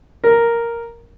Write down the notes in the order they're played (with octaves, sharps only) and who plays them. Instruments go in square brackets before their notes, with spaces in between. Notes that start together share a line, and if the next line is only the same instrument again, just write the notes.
[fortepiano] A#4